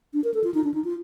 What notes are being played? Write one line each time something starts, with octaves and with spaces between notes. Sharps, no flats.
D4
A#4
A4
F4
D#4
D4
D#4
F4